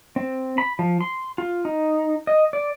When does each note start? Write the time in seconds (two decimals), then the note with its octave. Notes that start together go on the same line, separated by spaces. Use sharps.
0.16 C4
0.58 B5
0.79 F3
1.01 C6
1.38 F4
1.65 D#4
2.27 D#5
2.53 D5